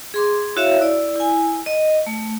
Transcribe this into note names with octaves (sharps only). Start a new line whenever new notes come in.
G#4 C6 D6
E4 F#4 C#5 E5 F5
E4 D5
E4 G#5
D#5
A3